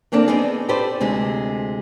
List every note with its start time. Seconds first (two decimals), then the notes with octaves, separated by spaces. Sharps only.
0.12 D3 A#3 C4 D4 A4
0.28 B3 C4 D4 D#4 G#4
0.69 G4 A4 B4 C5 D5
1.00 D2 C3 G#3